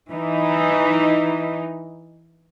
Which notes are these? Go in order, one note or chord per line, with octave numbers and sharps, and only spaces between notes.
E3 D#4